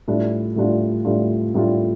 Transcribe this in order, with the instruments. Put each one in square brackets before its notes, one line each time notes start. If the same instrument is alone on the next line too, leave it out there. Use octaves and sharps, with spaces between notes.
[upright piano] A2 G3 D4 F4
A2 G3 D4 F4
A2 G3 D4 F4
A2 G3 D4 F4